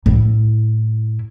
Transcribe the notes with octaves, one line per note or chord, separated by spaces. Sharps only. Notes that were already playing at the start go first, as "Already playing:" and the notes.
A2 E4